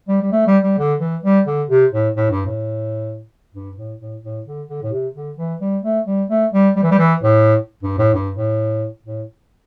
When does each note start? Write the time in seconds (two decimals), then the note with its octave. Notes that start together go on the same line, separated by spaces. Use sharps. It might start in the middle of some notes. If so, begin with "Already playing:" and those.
0.08 G3
0.22 G3
0.32 A3
0.47 G3
0.63 G3
0.78 D3
1.00 E3
1.24 G3
1.47 D3
1.69 C3
1.92 A2
2.16 A2
2.31 G2
2.46 A2
3.54 G2
3.77 A2
3.99 A2
4.23 A2
4.46 D3
4.68 D3
4.82 A2
4.92 C3
5.15 D3
5.38 E3
5.61 G3
5.83 A3
6.06 G3
6.30 A3
6.53 G3
6.76 G3
6.83 E3
6.91 G3
6.98 E3
7.23 A2
7.83 G2
7.98 A2
8.14 G2
8.37 A2
9.05 A2